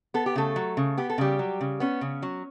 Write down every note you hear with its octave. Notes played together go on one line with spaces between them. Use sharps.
B3 A4
G4
C#3 A3 A4
F#3
C#3
B3 G4
A4
C#3 G3 G4
F#3
C#3
B3 C#4
C#3
F#3